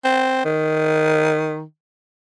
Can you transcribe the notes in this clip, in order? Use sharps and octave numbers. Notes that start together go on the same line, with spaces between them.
C4
D#3